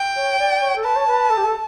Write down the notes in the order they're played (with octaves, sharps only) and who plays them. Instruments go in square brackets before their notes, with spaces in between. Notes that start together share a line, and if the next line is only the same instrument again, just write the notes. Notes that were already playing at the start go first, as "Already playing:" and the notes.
Already playing: [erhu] G5
[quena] C#5
D5
C#5
A4
[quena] B4 [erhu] A5
[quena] C#5
B4
A4
G4
A4